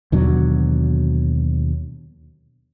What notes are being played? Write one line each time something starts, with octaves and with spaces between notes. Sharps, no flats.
D#2 B2 D3 F#3